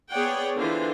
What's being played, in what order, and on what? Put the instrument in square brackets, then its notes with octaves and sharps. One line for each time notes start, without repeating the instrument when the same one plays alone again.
[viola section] B3 G#4 C#5 D5 F#5 G5
D3 E3 F4 C5